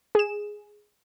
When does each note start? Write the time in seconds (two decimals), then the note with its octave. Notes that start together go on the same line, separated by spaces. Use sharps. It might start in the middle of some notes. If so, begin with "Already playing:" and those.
0.15 G#4 E7